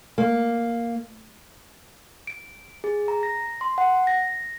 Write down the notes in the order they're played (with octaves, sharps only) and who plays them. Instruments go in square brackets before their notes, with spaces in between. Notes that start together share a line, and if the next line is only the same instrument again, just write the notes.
[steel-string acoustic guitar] A#3
[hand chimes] D7
G#4
A#5
A#6
C6
F#5
A#6